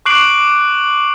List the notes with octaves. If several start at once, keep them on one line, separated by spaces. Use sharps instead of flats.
C#6 D6 F#6 C7 D7 F#7